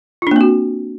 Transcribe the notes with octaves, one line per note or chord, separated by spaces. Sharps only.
A#3 C4 D4 F4 F#4